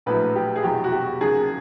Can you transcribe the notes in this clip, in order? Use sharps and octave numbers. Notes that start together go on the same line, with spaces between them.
A#1 A2 F#3 B4
G4
G#4
F1 E2 B2 F#3 G4
F#4
G4
D#2 C#3 F#3 G#4